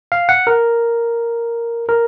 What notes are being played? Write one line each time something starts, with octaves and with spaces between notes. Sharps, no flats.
F5
F#5
A#4
A#4